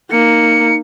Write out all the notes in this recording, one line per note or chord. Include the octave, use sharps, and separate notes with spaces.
A#3 D#4 C#7